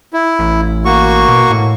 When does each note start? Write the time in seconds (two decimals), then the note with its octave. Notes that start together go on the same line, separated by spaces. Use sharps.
0.13 E4
0.39 A1
0.85 A#3 F#4 C#6
1.28 B2
1.50 A2